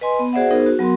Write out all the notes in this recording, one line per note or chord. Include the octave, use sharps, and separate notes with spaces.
B4 D#5 G#5 C6
B3
F#4 G#4 C5 D5 E5 F#5
B3 D#4 G#4 A#4 C5
F#4
F#3 B3 F#4 A#4 C6